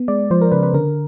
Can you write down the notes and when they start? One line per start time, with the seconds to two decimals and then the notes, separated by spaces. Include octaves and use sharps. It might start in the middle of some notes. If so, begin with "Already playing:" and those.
Already playing: B3
0.08 G#3 D5
0.31 F3 C5
0.41 A#4
0.52 C#3 B4
0.63 B4
0.74 D3 A#4